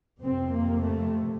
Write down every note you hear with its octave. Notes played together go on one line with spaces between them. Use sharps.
F2 C3 C4
A#3
A3